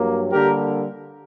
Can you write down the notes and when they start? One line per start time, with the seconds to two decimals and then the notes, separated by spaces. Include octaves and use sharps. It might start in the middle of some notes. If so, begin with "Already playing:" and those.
Already playing: G2 F#3 A#3
0.31 D3 G3 A#3 G4 A#4